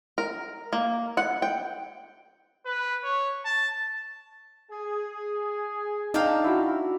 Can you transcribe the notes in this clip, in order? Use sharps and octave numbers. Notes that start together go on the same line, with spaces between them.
A#4
A#3
F#5
G5
B4
C#5
A5
G#4
D4 D#4 F5 G5 A5 A#5
E4 F#4